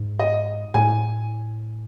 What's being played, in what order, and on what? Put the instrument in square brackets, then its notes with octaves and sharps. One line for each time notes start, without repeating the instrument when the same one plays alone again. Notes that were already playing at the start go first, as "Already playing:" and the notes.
Already playing: [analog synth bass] G#2
[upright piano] D#5
[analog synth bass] A2 [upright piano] G#5